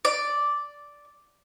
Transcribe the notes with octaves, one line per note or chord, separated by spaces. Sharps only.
D5